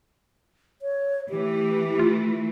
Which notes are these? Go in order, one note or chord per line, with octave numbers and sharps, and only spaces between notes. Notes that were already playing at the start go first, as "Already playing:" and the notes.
C#5
E3 A3 G4
F4